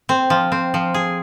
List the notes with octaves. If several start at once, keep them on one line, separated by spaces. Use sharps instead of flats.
C4
F3
C4
F3
G#4